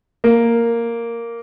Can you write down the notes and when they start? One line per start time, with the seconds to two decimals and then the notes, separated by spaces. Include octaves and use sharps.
0.24 A#3